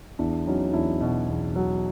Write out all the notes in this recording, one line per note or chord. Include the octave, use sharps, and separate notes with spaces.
E2 D4 E4
F#3 C#4 D#4
E2 D4 E4
B2
E2
F#3